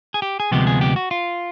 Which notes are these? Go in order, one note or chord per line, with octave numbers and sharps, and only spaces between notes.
G#4
G4
G#4
D2 C3 F3 G#3 B3 G4
G#4
G4
F#4
F4